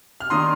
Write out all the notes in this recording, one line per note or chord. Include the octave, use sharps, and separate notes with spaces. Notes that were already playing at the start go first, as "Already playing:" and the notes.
F6
D#3 A#3 D4 C6 D#6